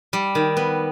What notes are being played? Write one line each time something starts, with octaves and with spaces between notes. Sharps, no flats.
G3
D#3
B3